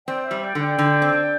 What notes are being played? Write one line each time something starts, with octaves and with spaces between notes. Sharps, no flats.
C4 D5 G5
C5 E5
G3
D5 G5
D3
D5 G5
D3
C4